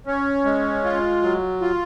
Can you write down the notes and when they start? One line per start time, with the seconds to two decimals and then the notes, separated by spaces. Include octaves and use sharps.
0.07 C#4
0.45 G#3
0.84 F4
1.23 F#3
1.62 F4